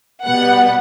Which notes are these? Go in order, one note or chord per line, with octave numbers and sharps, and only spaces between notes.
B2 G3 B3 F#5